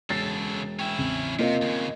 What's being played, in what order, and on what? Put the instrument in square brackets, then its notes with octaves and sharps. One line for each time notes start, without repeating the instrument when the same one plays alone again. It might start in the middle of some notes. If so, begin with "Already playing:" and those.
[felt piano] E1 A6 C7 [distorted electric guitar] C#3 A4
[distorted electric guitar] C#4 E4 [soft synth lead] G5
[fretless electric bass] A1 E2 C#3 [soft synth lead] C4
[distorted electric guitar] C3 [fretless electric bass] A#3 C4 [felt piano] F4 A#4 [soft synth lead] D#5
[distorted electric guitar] D#2 C#3